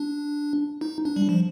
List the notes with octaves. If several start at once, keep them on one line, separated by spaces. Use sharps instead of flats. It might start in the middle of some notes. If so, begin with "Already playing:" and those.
Already playing: D4
D#4
D4
G3
F3